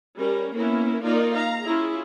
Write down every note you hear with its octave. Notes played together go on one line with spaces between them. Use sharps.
G3 C#4 A#4
A#3 B3 C#4 E4 A#4
A#3 D#4 F4 A#4 D5
F5 A#5
C#4 E4 F4 G#4